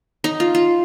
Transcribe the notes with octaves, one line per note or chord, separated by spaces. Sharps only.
D#4
F4
F4